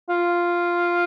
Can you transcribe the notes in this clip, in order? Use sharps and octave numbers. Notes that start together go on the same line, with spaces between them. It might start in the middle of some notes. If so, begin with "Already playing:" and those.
F4